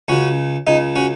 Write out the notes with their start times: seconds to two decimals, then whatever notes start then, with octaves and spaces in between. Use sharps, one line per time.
0.08 C#2 C#3 C#4 F#4
0.67 C#2 C#3 D#4
0.96 C#4 F#4